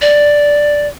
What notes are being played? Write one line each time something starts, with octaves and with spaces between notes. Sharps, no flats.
D5